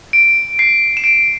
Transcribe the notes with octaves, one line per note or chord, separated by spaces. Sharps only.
D7
C7
E7
D7